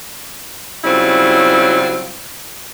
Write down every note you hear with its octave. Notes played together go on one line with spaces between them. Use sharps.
C#3 F#3 G3 C4 E4 F4